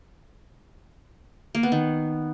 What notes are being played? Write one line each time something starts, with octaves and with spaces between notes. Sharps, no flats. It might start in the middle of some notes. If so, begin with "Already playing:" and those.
A#3
B3
D#3